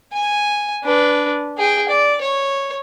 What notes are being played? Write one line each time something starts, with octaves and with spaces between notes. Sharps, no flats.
G#5
D4 B4
G#4 G5
D5
C#5